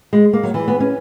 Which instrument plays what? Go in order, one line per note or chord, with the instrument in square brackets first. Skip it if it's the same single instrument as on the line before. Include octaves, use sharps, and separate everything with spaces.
[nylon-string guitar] G#3
A#3
F#3
E3
B3
C#4